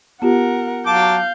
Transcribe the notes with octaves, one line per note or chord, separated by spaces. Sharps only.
B3 F4 G4 A#4 F#5
F#3 F5 A5 D6 G6